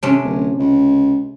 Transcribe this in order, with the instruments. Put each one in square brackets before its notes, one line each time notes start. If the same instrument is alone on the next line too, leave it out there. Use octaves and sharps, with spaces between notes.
[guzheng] C3 C#4 D4
[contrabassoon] D1
C#2